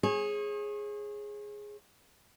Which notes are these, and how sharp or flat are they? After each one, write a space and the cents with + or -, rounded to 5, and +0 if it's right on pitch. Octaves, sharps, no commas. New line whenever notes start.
G#4 +0 C#5 -35